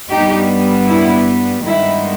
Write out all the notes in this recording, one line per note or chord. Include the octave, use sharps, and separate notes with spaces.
G2 G3 B3 D#4 G4
E4
G2 D#3 G#3 B3 E4